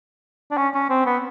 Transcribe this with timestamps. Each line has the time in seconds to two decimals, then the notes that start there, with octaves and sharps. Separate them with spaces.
0.51 D4
0.57 C#4
0.74 C#4
0.90 C4
1.06 B3